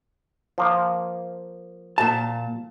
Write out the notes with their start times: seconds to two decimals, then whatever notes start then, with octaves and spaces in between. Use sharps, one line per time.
0.58 F3 A#3
1.98 A#2 A5